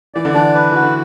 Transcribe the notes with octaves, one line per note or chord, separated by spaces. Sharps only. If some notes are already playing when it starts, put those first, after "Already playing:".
E3 D5
D3
E3 D4
B4
E3 F#4
D3